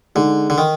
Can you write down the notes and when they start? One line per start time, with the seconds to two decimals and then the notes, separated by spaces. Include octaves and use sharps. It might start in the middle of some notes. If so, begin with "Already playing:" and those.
0.15 D3 G#3 D#4 G#4
0.50 D3
0.58 D#3